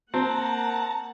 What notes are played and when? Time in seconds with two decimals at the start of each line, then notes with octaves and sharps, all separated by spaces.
0.14 A#3 C4 F#5 A5 A#5